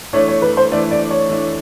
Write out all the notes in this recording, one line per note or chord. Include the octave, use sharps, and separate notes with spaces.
E3 A3 D4 C#5
C#5
B4
C5
E3 A3 D4 D5
D5
C#5
E3 A3 D4